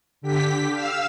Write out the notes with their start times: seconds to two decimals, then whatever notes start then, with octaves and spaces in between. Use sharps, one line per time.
0.21 D3 G4 B6
0.72 F5 E6